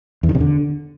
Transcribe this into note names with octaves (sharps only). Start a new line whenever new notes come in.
E2
D#3
C3
D3